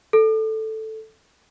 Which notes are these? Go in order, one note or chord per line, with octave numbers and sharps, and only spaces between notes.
A4